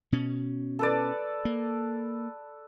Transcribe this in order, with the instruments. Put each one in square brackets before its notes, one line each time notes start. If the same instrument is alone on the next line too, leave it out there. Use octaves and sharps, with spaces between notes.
[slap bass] B2 C#4
[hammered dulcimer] A4 B4 D5
[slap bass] A#3